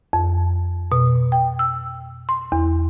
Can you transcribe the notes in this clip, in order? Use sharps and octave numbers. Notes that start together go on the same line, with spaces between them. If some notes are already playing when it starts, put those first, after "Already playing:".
F2
B2
G5
E6
C6
E2